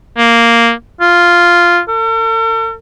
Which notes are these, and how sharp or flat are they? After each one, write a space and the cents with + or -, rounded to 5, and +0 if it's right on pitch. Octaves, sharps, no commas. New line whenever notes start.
A#3 -5
F4 -5
A4 +45